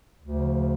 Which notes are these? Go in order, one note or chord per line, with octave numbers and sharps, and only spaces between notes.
D2 C#3 F3